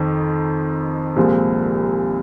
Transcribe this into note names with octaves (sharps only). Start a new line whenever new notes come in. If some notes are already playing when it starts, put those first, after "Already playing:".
Already playing: F2 D#3 C4 D#4
C2 A#2 F3 G#3